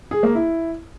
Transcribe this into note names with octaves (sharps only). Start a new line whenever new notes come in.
G#4
A#3
E4